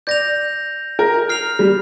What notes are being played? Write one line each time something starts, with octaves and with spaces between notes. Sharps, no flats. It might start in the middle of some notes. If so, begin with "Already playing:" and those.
D5 G6 A#6 F7
A#4
F6 C7 F7
G3